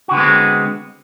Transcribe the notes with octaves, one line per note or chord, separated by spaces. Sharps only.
D3 G#3 B3 C4 F#4